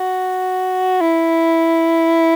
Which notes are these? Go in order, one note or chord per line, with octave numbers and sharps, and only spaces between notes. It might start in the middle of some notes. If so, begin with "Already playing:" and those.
Already playing: F#4
E4